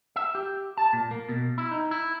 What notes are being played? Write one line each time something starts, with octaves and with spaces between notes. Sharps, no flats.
E5
G4
A5
A#2
A#3
B2
E4
D#4
E4